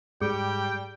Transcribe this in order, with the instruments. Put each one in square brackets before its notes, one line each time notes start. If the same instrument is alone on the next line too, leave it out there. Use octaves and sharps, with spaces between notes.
[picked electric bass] G#2 [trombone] G3 [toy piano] G#4 [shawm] G5